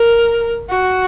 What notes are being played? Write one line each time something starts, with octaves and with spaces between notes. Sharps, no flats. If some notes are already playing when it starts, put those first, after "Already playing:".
Already playing: A#4
F#4